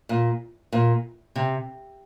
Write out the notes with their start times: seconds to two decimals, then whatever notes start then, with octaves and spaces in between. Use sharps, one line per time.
0.09 A#2
0.72 A#2
1.36 C3